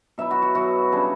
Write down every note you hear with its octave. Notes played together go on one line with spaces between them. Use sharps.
B2 F#3 B3 E4 E5
F#4
F#4
B2 F#3 B3 E4 F#4
C#3 G3 D4